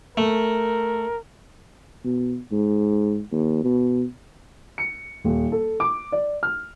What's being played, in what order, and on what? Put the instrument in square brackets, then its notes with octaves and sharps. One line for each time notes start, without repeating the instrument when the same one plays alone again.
[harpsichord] A3 [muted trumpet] A#4
[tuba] B2
G#2
D#2
B2
[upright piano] C#7
D#1
A4
D6
D5
F6